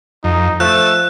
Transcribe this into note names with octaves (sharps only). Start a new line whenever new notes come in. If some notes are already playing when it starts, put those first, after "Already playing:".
F2 D#4
F3 A3 E6 F#6